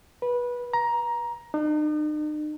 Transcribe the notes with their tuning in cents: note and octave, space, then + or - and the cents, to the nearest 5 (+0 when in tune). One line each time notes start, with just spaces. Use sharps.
B4 -20
A#5 +15
D#4 -45